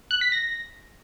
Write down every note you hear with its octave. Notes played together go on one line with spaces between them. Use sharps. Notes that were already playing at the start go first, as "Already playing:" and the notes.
F#6
B6
A#6